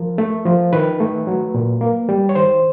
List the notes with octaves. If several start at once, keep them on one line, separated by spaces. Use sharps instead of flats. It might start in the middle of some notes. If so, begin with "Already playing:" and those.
Already playing: F3 A#4
A3
F3
D#3 B4
A3
F#3
A#2
A#3
G3
C#5
D#3 C5